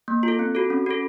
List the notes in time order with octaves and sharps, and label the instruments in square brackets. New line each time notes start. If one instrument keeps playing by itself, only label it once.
[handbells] A#3
F4 A4
C4
F#4 A4
C#4
F#4 A4